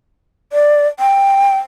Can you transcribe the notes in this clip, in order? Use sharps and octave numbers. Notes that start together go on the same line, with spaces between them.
D5
G5